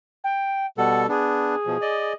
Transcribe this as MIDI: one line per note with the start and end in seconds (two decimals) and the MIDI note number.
0.24 0.66 79
0.78 1.07 47
0.78 1.07 55
0.78 1.07 69
0.78 1.03 78
1.09 1.55 59
1.09 1.55 62
1.09 2.14 68
1.66 1.77 47
1.66 1.77 53
1.81 2.13 74
1.81 2.13 75